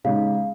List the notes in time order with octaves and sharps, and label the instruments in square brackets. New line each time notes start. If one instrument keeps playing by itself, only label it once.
[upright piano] C#3 G#3 D#4 [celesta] F5